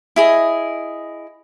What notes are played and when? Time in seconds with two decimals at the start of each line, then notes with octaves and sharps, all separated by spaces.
0.16 E4 G#4 D#5